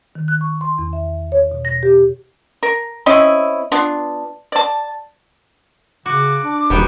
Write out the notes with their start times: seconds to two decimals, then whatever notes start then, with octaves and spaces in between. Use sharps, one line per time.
0.15 D#3
0.28 F#6
0.41 C#6
0.61 C6
0.78 E2
0.93 E5
1.32 C#5
1.51 B2
1.65 A#6
1.83 G4
2.63 A#4
3.06 C4 C#4 E4 D#5
3.72 B3 D4 F4
4.52 D5 A5
6.06 C#3 F#4 D6
6.44 D4
6.70 E1 D#3 G3 B3